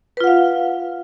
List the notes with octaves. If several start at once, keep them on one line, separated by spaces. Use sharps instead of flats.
F4 B4 F5 F#5